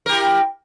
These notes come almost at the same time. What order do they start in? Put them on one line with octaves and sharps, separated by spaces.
A#4 G4 E4